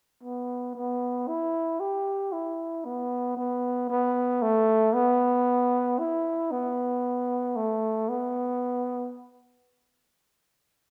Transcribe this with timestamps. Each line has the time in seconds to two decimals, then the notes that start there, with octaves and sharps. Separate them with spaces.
0.23 B3
0.75 B3
1.28 E4
1.80 G4
2.32 E4
2.85 B3
3.37 B3
3.90 B3
4.42 A3
4.94 B3
5.99 E4
6.51 B3
7.56 A3
8.08 B3